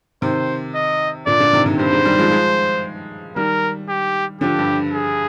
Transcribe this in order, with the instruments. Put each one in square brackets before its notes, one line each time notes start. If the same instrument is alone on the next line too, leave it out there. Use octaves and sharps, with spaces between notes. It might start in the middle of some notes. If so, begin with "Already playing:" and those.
[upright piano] C3 D#3 [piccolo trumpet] C5
[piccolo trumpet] D#5
[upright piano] A#2 D3 [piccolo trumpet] D5
[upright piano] A#2 D3
C3 D#3
C3 D#3
[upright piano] G2 [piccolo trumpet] C5
[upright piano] G#2
D#3 G3
F3 G#3
F3 G#3
[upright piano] D#3 G3 [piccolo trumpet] A#4
[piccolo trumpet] G4
[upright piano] D3 F3 [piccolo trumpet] G4
[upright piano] G2
[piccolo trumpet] G#4